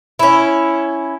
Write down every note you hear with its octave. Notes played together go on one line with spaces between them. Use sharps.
C#4 E4